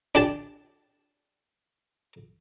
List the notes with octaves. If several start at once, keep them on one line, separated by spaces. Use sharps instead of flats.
D4 G4 A5